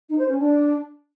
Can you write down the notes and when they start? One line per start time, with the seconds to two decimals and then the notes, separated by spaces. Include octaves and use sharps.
0.09 D#4
0.18 C5
0.28 C#4
0.37 D4